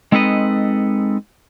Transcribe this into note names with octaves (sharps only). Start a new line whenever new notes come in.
G#3 C4 D#4 A4 B4 D#5